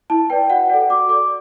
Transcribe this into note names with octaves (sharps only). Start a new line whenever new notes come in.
E4 A5
B4 D5 G5
F#4 F#5
A4 D5 F#5
F#4 D6
A4 D5 D6